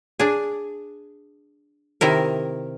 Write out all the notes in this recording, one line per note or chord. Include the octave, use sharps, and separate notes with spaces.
D4 G#4
C3 D#3 E4 A#4